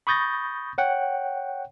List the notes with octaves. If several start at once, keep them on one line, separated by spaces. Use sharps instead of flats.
B5 C#6 D#6 G6 A6 A#6
C#5 F#5 G5